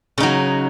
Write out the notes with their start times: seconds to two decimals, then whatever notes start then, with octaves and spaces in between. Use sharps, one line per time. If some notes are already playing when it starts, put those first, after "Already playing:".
0.18 C#3
0.20 D#4
0.23 F#3